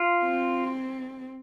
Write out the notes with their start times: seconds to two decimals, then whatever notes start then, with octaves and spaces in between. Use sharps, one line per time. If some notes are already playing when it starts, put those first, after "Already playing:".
Already playing: F4
0.24 C4